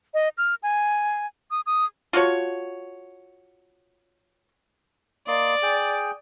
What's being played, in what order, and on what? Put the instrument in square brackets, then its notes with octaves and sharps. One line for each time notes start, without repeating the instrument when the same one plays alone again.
[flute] D#5
F6
G#5
D#6
D#6
[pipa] F4 F#4 A4 C#5
[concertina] A#3 D#5 C6 [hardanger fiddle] D5
[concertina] G#4 G5